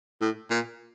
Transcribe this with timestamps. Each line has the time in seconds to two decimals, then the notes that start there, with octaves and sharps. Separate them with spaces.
0.21 A2
0.51 A#2